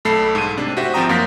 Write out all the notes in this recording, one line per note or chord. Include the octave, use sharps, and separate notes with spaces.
B1 A3 A4 B5 C7
G#2 D#7
C3 D4
F#4 G4 C5 E5
G#1 F3 C4 G5 A#5 D#6
F#2 A#3 F5 G6 A#6 B6